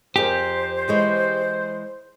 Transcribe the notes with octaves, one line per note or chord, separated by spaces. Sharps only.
F2 G4 G#4 A#4 C5
E3 G#3 C#5